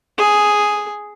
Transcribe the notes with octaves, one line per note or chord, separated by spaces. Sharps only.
G#4